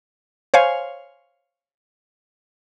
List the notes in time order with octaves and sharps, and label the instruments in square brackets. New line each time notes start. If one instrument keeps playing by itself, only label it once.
[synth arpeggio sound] C5 C#5 F5 G#5